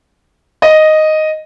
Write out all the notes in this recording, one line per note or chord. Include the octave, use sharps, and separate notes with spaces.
D#5